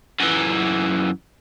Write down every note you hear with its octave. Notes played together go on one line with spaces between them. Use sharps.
F#2 E3